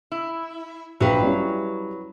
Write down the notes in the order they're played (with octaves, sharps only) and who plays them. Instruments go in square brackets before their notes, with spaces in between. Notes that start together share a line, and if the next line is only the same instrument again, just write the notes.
[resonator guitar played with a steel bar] E4
[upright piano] A#1 G5 [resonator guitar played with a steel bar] F#3 B4 F5
[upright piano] G3 C#4 E4